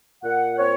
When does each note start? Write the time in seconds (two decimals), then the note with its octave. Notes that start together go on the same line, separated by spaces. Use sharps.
0.23 A#2 F#5
0.57 C4 C#5